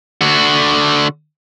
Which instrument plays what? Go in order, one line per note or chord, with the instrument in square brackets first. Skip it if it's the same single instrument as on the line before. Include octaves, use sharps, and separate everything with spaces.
[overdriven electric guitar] D3 F#4